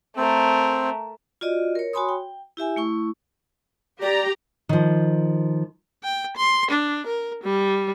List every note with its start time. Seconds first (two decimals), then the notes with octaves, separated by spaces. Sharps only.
0.17 A3 C4 A#4
1.41 F4 F#4 D5 D#5
1.75 A#4 C#5
1.93 F#4 C#5 G#5 B5 C6 D#6
2.09 G5
2.57 E4 G4 E5 G#5
2.76 A3 E4 C#6
4.02 G4 D5 A#5
4.69 D#3 F3
6.04 G5
6.36 C6
6.71 D4
7.07 A#4
7.43 G3